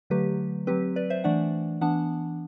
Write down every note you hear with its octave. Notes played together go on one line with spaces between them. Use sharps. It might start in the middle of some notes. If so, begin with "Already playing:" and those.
D3 F#3 A3 G4 B4
F#3 C4 G4 B4
B4 D5
C5 E5
E3 A3 D4 D5 F#5
E3 B3 D4 F#5 A5